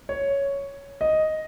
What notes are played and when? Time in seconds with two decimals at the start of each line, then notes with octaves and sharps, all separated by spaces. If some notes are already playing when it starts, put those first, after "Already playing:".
0.09 C#5
1.01 D#5